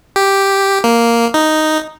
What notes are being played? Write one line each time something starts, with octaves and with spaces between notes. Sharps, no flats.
G4
A#3
D#4